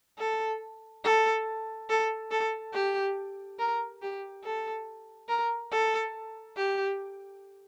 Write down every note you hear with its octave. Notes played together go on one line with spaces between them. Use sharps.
A4
A4
A4
A4
G4
A#4
G4
A4
A#4
A4
G4